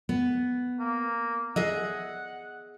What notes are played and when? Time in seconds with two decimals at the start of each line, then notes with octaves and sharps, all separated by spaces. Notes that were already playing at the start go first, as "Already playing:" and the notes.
0.09 B3
0.79 A#3
1.56 G#4 D#5 E5 F#5